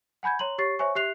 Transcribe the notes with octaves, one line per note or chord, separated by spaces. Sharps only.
F#5 G#5 B5 G6 G#6
C#5 A#5 C6 F#7
G4 C#5 C#6 A6 C7
C5 C#5 E5 G#5 C#6
G4 E5 F#6 C7 F7